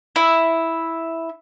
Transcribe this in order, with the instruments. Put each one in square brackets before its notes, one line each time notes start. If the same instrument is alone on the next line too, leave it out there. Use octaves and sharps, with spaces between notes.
[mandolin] E4